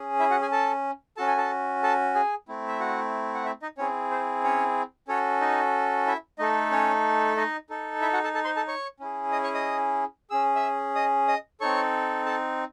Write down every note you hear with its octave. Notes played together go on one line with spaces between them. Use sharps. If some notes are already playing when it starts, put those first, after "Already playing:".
Already playing: C#4 G#4
E4 E5
F#4 F#5
G#4 G#5
A4 A5
C#4 F#4 A4 A5
G#5
A4 A5
A4 A5
G#4 G#5
A3 C4 E4
E5
F#4 F#5
F#5
E4 E5
D#4 D#5
C4 C#4 E4 G#4 C#5
C5
C#4 C#5
C#4 F#4 A4 C#5
D#4 D#5
E4 E5
A3 D#4 A4 D#5
C#4 C#5
D#4 D#5
D#4 A4
E4 E5
F#4 F#5
A4 A5
A4 A5
C5 C6
A4 A5
C#5 C#6
C#4 E4 G#4
D#5 D#6
C#5 C#6
D#5 D#6
C#4 G#4 E6
E5 E6
D#5 D#6
D#5 D#6
C4 D#4 A4 C#5 C#6
A4 A5